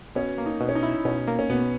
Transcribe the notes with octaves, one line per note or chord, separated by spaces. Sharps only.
B2 C#4
A#3
D#4
B2
C#4
D#4
E4
B2 C#4
A#3
C#4
B2 B3